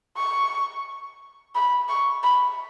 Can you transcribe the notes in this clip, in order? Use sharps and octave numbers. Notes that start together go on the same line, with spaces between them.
C#6
B5
C#6
B5